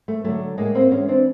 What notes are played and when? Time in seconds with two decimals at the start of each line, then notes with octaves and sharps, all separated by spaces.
0.08 A3
0.24 D3 F#3 A3
0.58 A2 G#3 A#3
0.75 A#3 C4
0.91 E3 G#3 B3 C#4
1.08 C4 D4